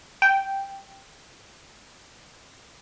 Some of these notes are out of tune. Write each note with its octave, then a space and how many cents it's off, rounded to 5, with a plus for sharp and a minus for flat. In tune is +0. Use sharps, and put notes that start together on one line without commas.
G5 -5